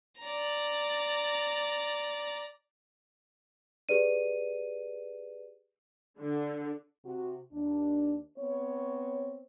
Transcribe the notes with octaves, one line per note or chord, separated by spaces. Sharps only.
D5 A#5
G4 G#4 B4 D5 D#7
D3
C3 F#4
D#2 D4
B3 C4 C#5